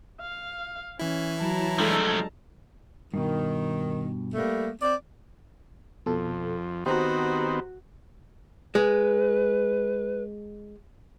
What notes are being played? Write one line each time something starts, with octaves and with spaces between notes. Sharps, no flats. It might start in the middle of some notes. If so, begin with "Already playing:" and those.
F5
E3 C#4 E4
F#3 A5 A#5
F3 G#3 A3 D4 A4
G2 B2 D#3
G3 A3 A#3
C4 D5
F2 B2 A4
D#3 B3 C4 F#4 G4 C5 A#5
G#3 B4